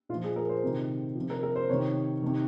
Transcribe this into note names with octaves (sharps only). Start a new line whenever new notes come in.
A#2 F4
F3
G#4
A#4
C5
C3 D#3
C3 F3
A#4
A#4
C5
C3 D#3 C#5
C3 D#3